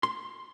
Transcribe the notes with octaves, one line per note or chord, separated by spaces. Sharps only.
C6